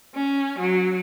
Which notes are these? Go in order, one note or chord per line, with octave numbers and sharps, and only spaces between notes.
C#4
F#3